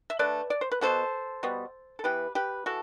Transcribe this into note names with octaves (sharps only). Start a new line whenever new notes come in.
E5
D3 A3 B4 D5
D5
C5
B4
B2 G3 B3 A4 C5
B2 G3 B3
A4
E3 B3 G4 B4
G4 B4
E3 F#4 A4